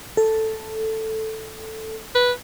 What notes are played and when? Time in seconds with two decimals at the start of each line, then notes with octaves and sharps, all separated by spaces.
0.17 A4
2.15 B4